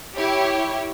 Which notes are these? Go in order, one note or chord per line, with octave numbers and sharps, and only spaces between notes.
E4 G4 C#5